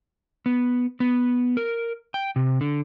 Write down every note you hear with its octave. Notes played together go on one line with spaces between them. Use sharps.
B3
B3
A#4
G5
C3
D3